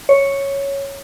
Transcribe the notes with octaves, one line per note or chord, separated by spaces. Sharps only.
C#5